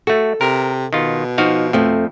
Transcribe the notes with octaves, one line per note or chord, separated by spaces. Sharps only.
A3 F#4 A4
C3 A#4
B2 D#3 F4
F3 D#4 F#4 F5
F2 F3 A3 C4